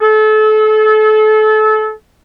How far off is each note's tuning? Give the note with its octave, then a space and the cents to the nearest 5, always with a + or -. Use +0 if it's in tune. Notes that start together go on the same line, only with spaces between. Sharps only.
A4 -30